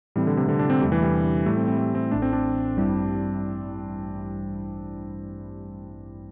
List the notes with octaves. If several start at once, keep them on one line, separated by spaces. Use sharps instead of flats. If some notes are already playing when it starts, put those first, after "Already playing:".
A2 E3 G3 A3 C4
D3
C3
D3
D4
C4
E2 C3 G3 A3 D4 G4
E3
G3
A2 G3 A3 E4 G4
C4
C4
A3
C4
A1 A2 A3 D4
C4
D4
A1 G2 G3 E4